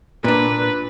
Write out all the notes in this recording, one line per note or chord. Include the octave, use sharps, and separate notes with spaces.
A#2 D4 B4